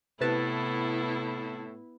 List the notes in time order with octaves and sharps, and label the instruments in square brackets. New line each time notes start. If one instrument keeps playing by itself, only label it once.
[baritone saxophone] A2 [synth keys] C3 B4 A5 [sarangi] B3 [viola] E4